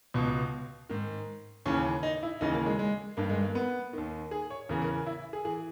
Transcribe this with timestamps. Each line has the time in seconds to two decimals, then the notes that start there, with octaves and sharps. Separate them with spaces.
0.14 C#2 B2
0.90 G#2 D#3
1.66 D#2 C#3 E3 C#4
2.03 D#4
2.23 E4
2.41 D#2 C#3 E3 D#4
2.54 A#3
2.66 G#3
2.79 G#3
3.17 G2 D#3 A#3
3.29 G#3
3.42 A#3
3.55 B3
3.93 D#2 D#3
4.31 G#4
4.50 C#5
4.69 E2 C#3 E3 A#4
4.82 A#4
5.07 E4
5.33 G#4
5.45 E3 G#4